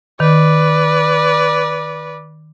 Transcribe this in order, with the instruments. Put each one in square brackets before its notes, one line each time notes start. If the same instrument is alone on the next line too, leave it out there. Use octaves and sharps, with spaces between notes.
[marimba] D#3 [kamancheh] B4 D5